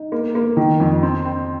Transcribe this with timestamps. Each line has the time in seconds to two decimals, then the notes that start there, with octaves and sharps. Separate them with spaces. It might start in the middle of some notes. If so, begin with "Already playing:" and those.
Already playing: D#4
0.12 A#3
0.35 A#3
0.57 D#3
0.80 F2
1.02 C4
1.25 C4